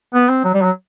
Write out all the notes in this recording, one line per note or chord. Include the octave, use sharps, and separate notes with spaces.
B3
C4
F#3
G3
F#3